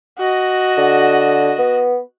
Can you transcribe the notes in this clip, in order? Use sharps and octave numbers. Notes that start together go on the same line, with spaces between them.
F#4 D#5
D3
B3